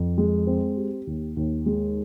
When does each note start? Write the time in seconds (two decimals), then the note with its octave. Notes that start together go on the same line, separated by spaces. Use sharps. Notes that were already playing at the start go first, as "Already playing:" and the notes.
Already playing: F2
0.18 G#3
0.47 C4
0.77 G4
1.07 D#2
1.37 D#2
1.66 G#3